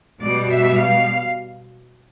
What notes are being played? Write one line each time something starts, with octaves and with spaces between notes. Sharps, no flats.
B2 G3 D5
E5
F5